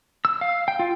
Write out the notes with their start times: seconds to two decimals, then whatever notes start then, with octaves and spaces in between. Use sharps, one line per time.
0.25 E6
0.41 F5
0.68 G5
0.79 F4